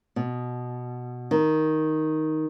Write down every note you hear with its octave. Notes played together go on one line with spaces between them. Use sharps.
B2
D#3